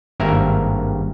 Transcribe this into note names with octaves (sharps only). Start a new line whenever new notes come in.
G#1 G2 A#3 A#4 E5